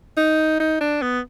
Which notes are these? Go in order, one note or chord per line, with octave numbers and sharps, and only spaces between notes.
D#4
D#4
D4
B3